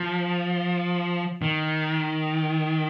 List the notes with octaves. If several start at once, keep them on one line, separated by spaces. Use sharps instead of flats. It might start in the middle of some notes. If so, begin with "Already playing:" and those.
Already playing: F3
D#3